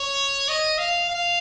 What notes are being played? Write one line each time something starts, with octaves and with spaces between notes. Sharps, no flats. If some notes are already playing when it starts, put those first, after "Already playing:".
Already playing: C#5
D#5
F5
F5